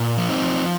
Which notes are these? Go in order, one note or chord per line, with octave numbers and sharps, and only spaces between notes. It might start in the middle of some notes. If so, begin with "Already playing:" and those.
Already playing: A#2
F3
C4 D#4
F3